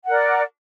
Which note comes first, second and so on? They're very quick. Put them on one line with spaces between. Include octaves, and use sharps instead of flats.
F#5 A#4 D5